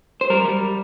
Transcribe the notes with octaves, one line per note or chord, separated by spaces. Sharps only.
C5
G3 A#4
G3